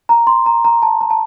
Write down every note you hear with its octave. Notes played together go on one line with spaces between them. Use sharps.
A#5
C6
A#5
A#5
A5
A#5
A5